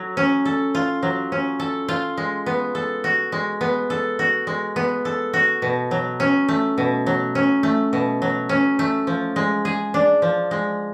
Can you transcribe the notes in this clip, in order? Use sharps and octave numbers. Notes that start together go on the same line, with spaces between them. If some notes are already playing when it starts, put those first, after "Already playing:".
Already playing: F#3 A4
C#4
A4
F4
F#3
C#4
A4
F4
G#3
B3
A4
F#4
G#3
B3
A4
F#4
G#3
B3
A4
F#4
B2
F#3
C#4
A3
B2
F#3
C#4
A3
B2
F#3
C#4
A3
F3
G#3
G#4
D4
F3
G#3